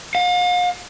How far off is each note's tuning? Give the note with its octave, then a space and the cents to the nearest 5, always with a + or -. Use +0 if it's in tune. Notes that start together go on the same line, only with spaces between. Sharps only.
F5 +40